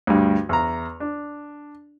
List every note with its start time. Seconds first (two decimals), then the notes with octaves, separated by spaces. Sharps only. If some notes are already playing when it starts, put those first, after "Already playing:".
0.07 D2 G2
0.49 E2 A#5
1.00 D4